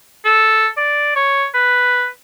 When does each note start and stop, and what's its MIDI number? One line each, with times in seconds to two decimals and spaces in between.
0.25 0.67 69
0.77 1.15 74
1.16 1.46 73
1.54 2.06 71